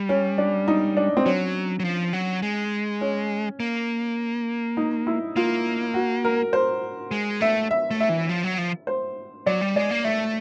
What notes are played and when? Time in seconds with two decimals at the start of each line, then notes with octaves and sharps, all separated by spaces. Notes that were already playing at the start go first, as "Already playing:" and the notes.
Already playing: G3
0.09 C#4
0.38 D4
0.68 D#4
0.97 D4
1.17 C4
1.25 F#3 C#4
1.80 F#3
1.85 F3
2.13 F#3
2.42 G#3
3.01 C#4
3.60 A#3
4.77 D#4
5.07 E4
5.36 A#3 F4
5.94 F#4
6.25 A#4
6.53 C5
7.11 G#3
7.41 A3 E5
7.71 E5
7.91 A3
8.00 E5
8.09 E3
8.29 F3
8.44 F#3
8.58 F3
8.87 C5
9.46 F#3 D5
9.61 G3
9.76 G#3 D5
9.91 A#3
10.04 A3 E5